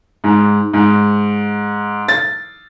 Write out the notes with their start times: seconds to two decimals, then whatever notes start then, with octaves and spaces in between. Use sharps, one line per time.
0.24 G#2
0.73 G#2
2.08 A6